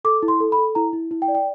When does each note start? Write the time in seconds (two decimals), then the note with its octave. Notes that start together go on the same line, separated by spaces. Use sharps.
0.05 A4 D6
0.23 E4
0.28 C6
0.40 A4
0.52 B5
0.58 A4
0.75 E4 A#5
0.93 E4
1.11 E4
1.22 G5
1.28 D5
1.35 G5